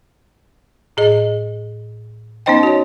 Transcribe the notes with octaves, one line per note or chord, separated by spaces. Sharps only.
A2 G#4 D#5
B3 C#4 D#4 C5 D#5 G5
F#4 C#5